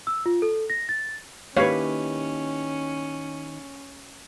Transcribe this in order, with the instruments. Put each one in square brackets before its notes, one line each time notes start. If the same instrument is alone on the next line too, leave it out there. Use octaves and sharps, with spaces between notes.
[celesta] E6
F4
A4
A#6
A6
[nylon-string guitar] D#3 E4 B4 [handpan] A#3 G4 [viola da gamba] C#4 [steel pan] C#5 F5